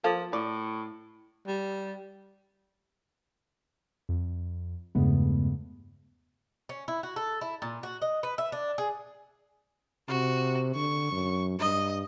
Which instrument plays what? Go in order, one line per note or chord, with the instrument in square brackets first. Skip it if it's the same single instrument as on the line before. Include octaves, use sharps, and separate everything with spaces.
[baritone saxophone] F3 [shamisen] A#3 A4 F5
[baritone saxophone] A2 [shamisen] D5
[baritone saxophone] G3
[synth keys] F2
E2 G2 C#3 G#3 A3 B3
[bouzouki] C#4
E4
F#4
A4
E4
A#2
F#4
D#5
B4
E5
D4
G#4
[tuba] C3 [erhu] F#4
[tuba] D3 [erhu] C#6
[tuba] F#2
[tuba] G2 [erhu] D#5